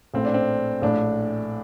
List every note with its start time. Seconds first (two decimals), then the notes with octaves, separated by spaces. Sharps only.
0.14 A#1 A2 A3 C4
0.25 D4
0.34 C4
0.82 A#1 A2 A3 D4